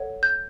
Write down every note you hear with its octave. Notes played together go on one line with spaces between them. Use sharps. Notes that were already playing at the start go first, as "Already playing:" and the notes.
Already playing: A4 C#5 F#5
G6